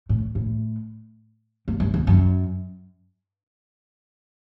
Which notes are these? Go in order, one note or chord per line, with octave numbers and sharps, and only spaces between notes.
A2
A2
G2
G2
E2
F#2